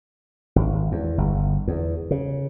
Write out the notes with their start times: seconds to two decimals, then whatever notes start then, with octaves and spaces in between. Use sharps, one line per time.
0.56 G#1
0.92 E2
1.18 G1
1.68 E2
2.11 C#3